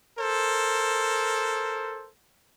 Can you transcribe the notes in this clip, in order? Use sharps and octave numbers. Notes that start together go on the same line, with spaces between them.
A4 A#4 C5